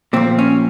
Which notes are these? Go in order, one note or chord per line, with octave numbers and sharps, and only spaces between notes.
A#2 F3 C4
C#4